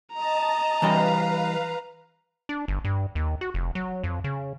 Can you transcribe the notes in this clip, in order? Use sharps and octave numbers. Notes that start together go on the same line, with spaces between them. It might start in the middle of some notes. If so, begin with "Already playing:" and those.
D#5 A5 A#5
E3 G3 B4 D#5 F5
D4
G1
G2
D#2
F#4
F1
F#3
F2
C#3